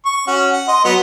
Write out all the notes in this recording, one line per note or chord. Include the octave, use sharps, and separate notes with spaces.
C#6
C#4 F#4
F#5
D#5 C6
F#3 B3